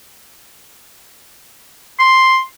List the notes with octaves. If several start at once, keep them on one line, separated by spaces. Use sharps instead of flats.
C6